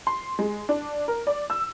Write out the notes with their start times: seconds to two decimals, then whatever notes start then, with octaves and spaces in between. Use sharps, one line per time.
0.07 C6
0.39 G#3
0.69 D4
1.08 A#4
1.27 D5
1.50 E6